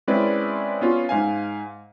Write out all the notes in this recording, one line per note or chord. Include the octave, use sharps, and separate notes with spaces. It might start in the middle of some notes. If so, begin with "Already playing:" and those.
G#3 C4 C#4 E4 B4 D5
B3 C#4 F4
G#2 F5 G#5